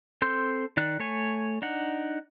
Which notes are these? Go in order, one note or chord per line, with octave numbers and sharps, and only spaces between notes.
C4 A4 C6 G6
D#3 D5 F#6
A3 C#5 G#5
D4 D#4 F#5